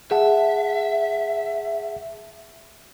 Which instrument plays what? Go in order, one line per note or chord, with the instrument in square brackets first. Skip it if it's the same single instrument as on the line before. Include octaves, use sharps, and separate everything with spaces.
[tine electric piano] G#4 F#5 A5 [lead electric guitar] E5